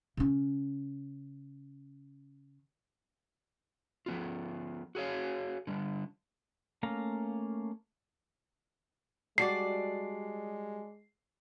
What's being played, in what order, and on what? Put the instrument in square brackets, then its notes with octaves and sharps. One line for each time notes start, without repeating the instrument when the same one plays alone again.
[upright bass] C#3 C#4
[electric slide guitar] F3 B3 F4
F#4 G#4 C#5 F5
D3 G3
[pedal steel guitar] A3 A#3 C#4 F5 A#5
[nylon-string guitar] G3 F#4 [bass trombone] G#3 [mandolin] D4 D5 [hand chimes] C7